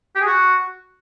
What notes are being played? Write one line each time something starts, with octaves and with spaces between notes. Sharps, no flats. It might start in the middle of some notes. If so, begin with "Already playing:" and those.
G4
G#4
F#4